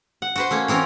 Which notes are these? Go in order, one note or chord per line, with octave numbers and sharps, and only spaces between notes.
F#5
F#4 B4 C5
A3 A#3 C#4
E3 C4 C#4 A#4